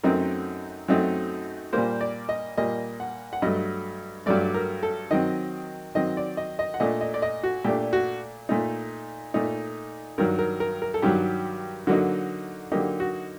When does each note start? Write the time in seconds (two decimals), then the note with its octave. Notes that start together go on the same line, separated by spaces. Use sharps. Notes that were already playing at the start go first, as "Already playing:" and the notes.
0.03 F#2 F#3 A3 C4 D#4 A#4
0.88 F#2 F#3 A3 C4 D#4
1.73 A#2 G3 A#3 C5
2.01 D5
2.29 D#5
2.57 A#2 G3 A#3 D#5
3.00 F#5
3.33 F#5
3.42 G2 F#3 A3 D#5
4.26 G2 F#3 A3 D5
4.54 A#4
4.83 A4
5.11 D#3 F#3 C4 D#5
5.95 D#3 F#3 C4 D#5
6.17 D5
6.37 D#5
6.59 D#5
6.74 F#5
6.80 A#2 A3 D4 D#5
7.01 D#5
7.14 D5
7.22 D#5
7.43 F#4
7.64 A#2 A3 D4 G4
7.93 F#4
8.49 A#2 A3 D#4
9.34 A#2 A3 D#4
10.18 G2 D#3 F#3 A#4
10.39 A#4
10.60 A#4
10.82 A#4
10.94 A4
11.02 G2 D#3 F#3 G4
11.87 D3 F#3 A#3 D#4 F#4
12.72 D3 F#3 A#3 D#4 G4
13.00 F#4